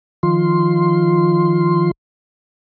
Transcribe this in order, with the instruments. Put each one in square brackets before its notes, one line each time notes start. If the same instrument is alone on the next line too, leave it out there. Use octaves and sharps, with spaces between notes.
[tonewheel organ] D#3 F3 F4 C6